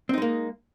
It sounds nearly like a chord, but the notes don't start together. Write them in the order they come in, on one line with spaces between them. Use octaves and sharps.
C4 D#4 G#3 A#3